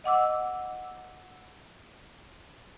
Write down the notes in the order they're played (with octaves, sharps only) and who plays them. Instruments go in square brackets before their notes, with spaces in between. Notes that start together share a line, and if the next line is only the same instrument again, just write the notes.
[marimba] D#5 F#5 D6 E6